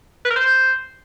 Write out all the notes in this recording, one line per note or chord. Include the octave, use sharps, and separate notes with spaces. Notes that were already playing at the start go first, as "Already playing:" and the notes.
B4
A#4
C5